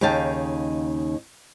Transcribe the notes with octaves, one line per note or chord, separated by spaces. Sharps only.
D#2 C#3 D#4 F5 G5 A5